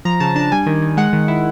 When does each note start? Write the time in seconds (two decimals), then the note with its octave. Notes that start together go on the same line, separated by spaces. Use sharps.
0.05 F3 A#5
0.20 C#3 A5
0.36 D4 A5
0.52 G3 G#5
0.66 D#3
0.82 D#3
0.97 G#3 F#5
1.13 D#3
1.28 E4